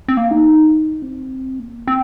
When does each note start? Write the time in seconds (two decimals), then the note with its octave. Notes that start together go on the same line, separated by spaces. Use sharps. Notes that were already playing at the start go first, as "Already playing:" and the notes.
0.08 C4
0.17 A#3
0.31 D#4
1.02 C4
1.59 A#3
1.88 C4